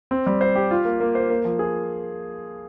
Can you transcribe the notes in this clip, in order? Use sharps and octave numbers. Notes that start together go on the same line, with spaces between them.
C4
G3
C5
G4
F4
A#3
A#3
C5
A#3
F3
G#4